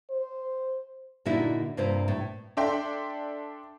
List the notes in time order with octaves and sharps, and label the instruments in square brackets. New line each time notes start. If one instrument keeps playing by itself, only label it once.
[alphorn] C5
[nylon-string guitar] A#2 D3 A#3 D#4 E4 F#4
G2 C3 A#3 F4 C5
A2
[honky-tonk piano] D4 A4 D5 E5 G5 C6